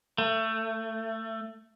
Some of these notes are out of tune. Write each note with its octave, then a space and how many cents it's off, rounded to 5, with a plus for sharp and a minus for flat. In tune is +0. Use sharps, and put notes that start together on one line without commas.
A3 +20